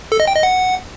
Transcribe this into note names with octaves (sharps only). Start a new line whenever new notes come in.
A4
D#5
G5
D#5
F#5